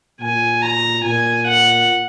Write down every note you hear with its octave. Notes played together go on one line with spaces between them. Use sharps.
A#2 G#5
A#5
A#2 G#5
F#5